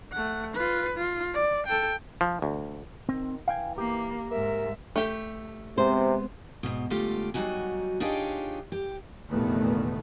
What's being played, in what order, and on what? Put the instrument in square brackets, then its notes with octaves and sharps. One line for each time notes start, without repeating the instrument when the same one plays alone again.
[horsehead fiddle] A3 F#5
F4 B4
F4
D5
A4 G5
[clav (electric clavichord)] F3
D2
[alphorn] D#3 [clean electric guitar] C4
[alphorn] E3 [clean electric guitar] F5 G5 G#5
[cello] A#3 [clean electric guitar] G4
[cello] G#2 E5 [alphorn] A#4
[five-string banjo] A3 G4
[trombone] C3 [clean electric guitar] G#3 B3 C4 [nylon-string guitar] C5
[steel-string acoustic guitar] G#2 B2
G#2 D3 G3 A3 F4 G4
F#3 G3 D#4 F#4 G#5
D4 D#4 F4 G4 G#4 C#5
G4
[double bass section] F1 E2 A#2 D#3 A3 B3